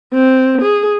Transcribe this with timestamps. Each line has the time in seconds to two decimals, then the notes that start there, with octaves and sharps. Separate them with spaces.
0.14 C4
0.62 G#4